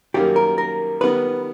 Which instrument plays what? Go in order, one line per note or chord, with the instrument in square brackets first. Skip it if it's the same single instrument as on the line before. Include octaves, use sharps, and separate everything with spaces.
[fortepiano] F#2 D#3 G3 A#3 [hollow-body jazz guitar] G4
[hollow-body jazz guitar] A#4
A#4
[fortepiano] D#3 G3 B3 [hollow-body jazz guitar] B4